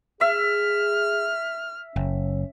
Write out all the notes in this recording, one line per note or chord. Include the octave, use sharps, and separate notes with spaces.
G#4 E5 F6
F#1 C#4